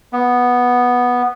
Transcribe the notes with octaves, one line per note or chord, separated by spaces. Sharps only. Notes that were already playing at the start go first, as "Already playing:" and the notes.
B3